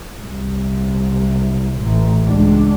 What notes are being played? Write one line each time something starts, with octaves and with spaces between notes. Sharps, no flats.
C2
A1
C#2 D4